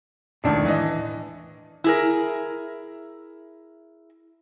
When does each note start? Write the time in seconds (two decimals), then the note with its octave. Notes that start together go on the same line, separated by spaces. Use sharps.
0.44 E1 C#2 A2 D#3 D4
0.65 E3 D#5
1.84 E4 G#4 A#4